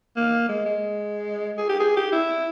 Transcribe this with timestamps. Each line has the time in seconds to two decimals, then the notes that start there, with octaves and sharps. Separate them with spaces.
0.16 A#3
0.49 G#3
0.66 G#3
1.58 G#4
1.69 G4
1.80 G#4
1.97 G4
2.12 E4